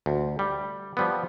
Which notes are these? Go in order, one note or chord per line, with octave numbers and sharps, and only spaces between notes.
D2
G3
F3 G3 B3